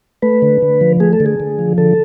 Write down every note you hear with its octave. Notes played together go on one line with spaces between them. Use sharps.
A3 B4
D3
D3
F3
A3 G#4
A4
D3
G#4
D3
F3
D3 A4